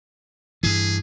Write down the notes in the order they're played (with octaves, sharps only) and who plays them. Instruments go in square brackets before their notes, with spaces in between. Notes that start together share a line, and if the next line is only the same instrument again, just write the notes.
[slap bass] G2 E3 [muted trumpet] G#4